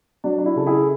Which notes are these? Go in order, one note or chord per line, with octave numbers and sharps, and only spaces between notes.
F#3 D4
D4
E4
C#3 A4
E4 G#4